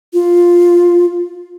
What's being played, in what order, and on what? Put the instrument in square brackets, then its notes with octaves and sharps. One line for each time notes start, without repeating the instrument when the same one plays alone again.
[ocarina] F4